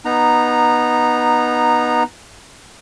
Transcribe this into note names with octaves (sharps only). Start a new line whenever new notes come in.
B3 D#4 A#5